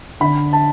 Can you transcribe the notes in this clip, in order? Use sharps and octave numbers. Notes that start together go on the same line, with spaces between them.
D3 B5
A5